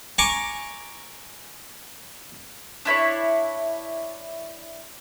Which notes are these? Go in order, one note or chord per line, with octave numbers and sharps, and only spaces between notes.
G#5 A#5 C#6 D6
D4 E4 C5 C#5